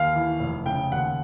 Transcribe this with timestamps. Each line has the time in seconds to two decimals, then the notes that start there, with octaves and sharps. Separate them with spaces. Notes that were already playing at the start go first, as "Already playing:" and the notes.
Already playing: D#2 F5
0.15 E3
0.40 F1
0.66 C#3 G5
0.92 D#2 F#5